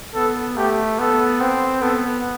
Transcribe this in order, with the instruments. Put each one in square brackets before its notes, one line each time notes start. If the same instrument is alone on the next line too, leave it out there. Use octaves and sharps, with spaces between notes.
[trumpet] B3 [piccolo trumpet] A4
[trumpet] A3 [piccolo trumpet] G4
[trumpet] B3 [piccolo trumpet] A4
[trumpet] C4
[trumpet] B3 [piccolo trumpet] A4